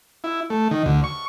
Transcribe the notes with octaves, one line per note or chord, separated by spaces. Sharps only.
E4
A3
D#3
D2
C#6